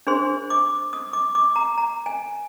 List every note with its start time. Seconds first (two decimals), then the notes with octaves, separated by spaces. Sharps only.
0.07 D4 G#4 C5 C6
0.50 D6
0.93 D#6
1.13 D6
1.35 D6
1.56 A#5
1.78 A#5
2.06 G#5